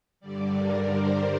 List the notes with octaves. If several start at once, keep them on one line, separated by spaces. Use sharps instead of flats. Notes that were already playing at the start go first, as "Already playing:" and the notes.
G2 D3 G3 D5
A#4
C5